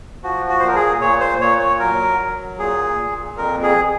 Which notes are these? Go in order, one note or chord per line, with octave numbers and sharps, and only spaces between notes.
F3 F#4
F#4
A#2 C5
A#4
G#4
A#2 C#5
C5
A#2 C#5
C#5
F#3 A#4
F#3
A#2 G#4
A#2
F2 A#4
G#4